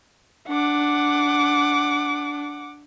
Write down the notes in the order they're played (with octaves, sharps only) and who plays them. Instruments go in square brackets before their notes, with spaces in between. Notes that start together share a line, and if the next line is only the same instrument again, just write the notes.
[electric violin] D4 [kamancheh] F#5 D6